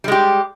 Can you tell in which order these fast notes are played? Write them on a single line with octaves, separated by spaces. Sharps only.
G3 G#3 G4